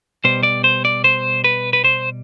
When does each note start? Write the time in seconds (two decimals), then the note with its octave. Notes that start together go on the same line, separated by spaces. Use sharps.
0.24 B2 G3 C5
0.43 D5
0.64 C5
0.85 D5
1.04 C5
1.44 B4
1.73 B4
1.84 C5